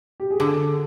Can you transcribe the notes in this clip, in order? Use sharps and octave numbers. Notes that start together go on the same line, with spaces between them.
G4
G#4
D3 A4